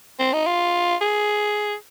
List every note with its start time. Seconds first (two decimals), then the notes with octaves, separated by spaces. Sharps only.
0.19 C4
0.33 D#4
0.47 F4
1.01 G#4